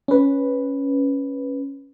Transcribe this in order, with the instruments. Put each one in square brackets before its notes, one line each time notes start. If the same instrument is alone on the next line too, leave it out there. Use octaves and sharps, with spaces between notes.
[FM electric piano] C#4 B4